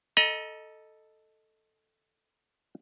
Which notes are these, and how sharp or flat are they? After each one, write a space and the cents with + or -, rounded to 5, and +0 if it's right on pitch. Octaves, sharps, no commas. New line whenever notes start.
A4 +0 D#5 +0 A#5 +40